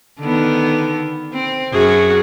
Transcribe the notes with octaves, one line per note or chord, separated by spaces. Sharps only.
D3 D#3 B3
C4
F#2 F#4 G#4